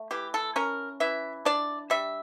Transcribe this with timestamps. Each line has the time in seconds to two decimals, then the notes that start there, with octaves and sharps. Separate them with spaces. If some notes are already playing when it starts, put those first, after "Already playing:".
Already playing: A3
0.11 E3 G4
0.34 A4
0.56 C#4 A#4
1.00 E3 E5
1.45 D4 D5
1.90 G3 E5